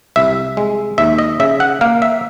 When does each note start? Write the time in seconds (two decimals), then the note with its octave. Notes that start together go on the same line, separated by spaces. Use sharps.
0.16 C2 E5
0.57 G#3
0.98 D#2 E5
1.19 D#5
1.40 C#3 E5
1.60 F#5
1.81 A#3 F5
2.02 E5